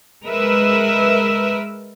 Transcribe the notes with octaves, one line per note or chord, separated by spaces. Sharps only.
G#3 A#4 B4 E5